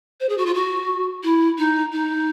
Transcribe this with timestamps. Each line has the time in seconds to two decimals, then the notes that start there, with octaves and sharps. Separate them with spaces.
0.20 C5
0.29 G#4
0.38 F#4
0.46 F4
0.54 F#4
1.23 E4
1.58 D#4
1.93 D#4